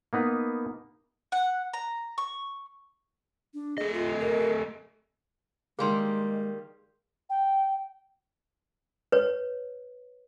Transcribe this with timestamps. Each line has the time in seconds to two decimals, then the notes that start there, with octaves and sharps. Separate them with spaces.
0.13 A#3 B3 D#4 B4
1.32 F#5
1.73 A#5
2.18 C#6
3.54 D4
3.78 A3 G#4 D#5
3.94 F4
4.20 A#4
5.79 D#3 G3 G#3 A#3 G#4 C6
7.29 G5
9.12 B4 C#5